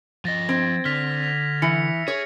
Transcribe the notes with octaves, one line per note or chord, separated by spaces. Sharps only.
F3 D#5 A6 A#6
C4 G#6 A#6
D3 F6 B6 F7
F7
E3 C#7
G#4 C#5